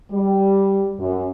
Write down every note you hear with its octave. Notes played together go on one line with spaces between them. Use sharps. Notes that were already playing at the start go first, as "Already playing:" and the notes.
G3
F#2